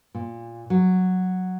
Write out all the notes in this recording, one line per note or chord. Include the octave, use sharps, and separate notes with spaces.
A#2
F#3